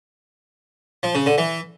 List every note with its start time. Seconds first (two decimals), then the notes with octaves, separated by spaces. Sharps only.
1.03 F3
1.15 C#3
1.26 D3
1.38 E3